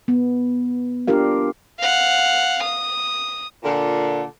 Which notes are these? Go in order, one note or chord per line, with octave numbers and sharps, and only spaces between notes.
B3
D4 F4 G4 A#4 F5
F5 F#5
D#6
A#2 D3